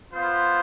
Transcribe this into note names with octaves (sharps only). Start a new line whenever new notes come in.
B3 F4 C5